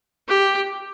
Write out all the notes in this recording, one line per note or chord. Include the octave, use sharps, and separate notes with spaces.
G4